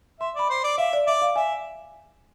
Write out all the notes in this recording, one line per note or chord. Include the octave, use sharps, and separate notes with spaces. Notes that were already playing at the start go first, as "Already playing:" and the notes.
E5 C6
D5 B5
C5
D5
E5 F5
D5
D5 E5
F5
E5 G#5